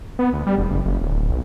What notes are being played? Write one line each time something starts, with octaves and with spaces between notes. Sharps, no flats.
B3
D2
G3
E1
F#1
F#1
D1
B1